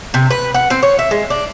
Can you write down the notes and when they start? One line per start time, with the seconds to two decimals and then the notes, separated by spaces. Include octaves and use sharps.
0.14 C3
0.31 B4
0.55 F#5
0.70 C4
0.83 C#5
0.99 E5
1.11 G#3
1.30 D4